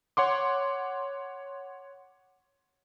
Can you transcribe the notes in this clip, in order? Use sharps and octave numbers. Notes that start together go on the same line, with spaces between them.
C#5 F#5 C6 D6